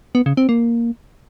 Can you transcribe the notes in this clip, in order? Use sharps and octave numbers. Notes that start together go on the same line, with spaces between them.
B3
C#3
C4
A#3